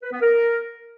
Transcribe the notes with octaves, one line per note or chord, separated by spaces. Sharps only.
B4
B3
A#4